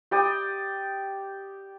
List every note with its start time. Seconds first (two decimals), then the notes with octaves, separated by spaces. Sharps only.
0.11 G4 D5 G5 D#6